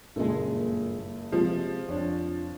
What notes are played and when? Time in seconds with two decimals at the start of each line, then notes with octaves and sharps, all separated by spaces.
0.16 F#1 G2 A#2 C#3 G#3 A4
1.32 C3 F3 G#3
1.89 F2 D4 C#5